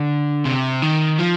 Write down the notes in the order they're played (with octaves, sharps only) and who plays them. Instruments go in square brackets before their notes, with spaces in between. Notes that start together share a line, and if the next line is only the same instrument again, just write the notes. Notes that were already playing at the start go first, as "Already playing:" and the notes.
Already playing: [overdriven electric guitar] D3
C3
D#3
F3